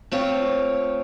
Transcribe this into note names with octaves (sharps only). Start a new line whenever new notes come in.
A3 C4 F4 C#5